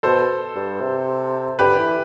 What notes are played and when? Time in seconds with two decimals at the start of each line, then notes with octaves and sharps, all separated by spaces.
0.03 B2 A4 C5
0.55 G2
0.81 C3
1.59 D3 G4 B4
1.79 E3